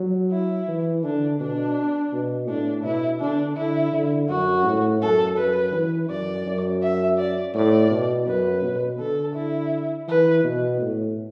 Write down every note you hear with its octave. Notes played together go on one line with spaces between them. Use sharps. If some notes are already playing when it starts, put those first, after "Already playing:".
Already playing: F#3
E4
E3
D3 D4
B2 D4
B2
A2 D4
B2 E4
D3 D4
D3 E4
D3
F#2 F#4
A2
F#2 A4
F#2 B4
E3
F#2 D5
F#2
E5
D5
A2 D5
B2
F#2 B4
B2
D3 A4
E4
E3 B4
B2
A2